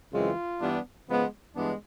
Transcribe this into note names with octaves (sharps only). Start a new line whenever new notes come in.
F#2 C#3 E3 G#3 C4 F4
G2 E3 G3 B3 D4
C#3 F3 G#3 B3
G2 E3 G#3 B3 D4